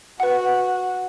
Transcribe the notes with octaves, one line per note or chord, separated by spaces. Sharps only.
F#4 B4 F#5